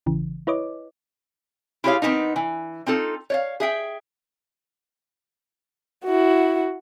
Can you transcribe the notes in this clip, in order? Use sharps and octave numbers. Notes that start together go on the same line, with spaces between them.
A1 C#3 E3
E4 B4 C#5 D#5 D6
E4 F4 G4 G#4 C#5 F5
D#3 F#3 B3 C4 D#4
E3
C4 D#4 F4 A4
C#5 D5 F5
G#4 E5 G5
E4 F#4